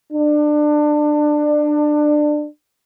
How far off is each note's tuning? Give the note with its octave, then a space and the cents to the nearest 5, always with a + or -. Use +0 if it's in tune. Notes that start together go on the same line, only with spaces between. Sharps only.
D4 +25